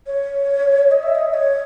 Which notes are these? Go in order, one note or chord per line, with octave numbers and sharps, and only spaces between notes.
C#5
D#5
E5
D#5
C#5